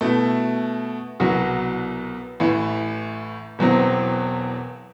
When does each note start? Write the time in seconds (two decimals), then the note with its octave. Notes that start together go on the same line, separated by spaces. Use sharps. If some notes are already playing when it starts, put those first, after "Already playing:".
0.01 B2 A3 E4
1.20 C2 B2 F#3 B3 F#4
2.40 A1 A2 E3
3.59 E1 E2 B2 F#3 C4